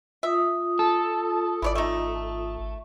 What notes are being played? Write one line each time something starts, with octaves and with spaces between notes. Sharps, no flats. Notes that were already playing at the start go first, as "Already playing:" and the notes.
F4 E5 D#6
A4
G#1 E4 C#5 D5
A3 D#4